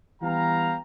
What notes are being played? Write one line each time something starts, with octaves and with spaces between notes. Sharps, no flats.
E3 G3 B3 F5 G5 A#5